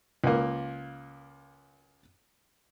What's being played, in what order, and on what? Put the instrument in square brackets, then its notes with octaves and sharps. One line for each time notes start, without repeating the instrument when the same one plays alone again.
[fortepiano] C#2 A#3